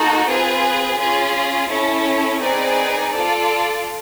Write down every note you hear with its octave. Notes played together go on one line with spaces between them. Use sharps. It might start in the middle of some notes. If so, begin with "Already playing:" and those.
Already playing: A#3 D#4 F#4 A4
C4 F4 G#4 B4
C#4 F4 G#4
C#4 E4 A4 C#5
C4 D#4 G#4 B4 D5
F4 A4 D5